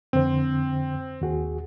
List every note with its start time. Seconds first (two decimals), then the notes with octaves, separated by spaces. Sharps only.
0.13 F2 D3 C4 C5
1.21 D#2 F#4 G#4